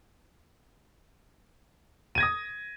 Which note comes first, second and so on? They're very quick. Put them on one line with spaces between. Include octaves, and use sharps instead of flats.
D#7 G#6 A#6 D#6